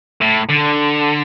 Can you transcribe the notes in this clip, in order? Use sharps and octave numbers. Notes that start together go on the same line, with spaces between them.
A2
D3